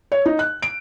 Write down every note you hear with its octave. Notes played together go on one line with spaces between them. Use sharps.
C#5
D#4
F#6
D7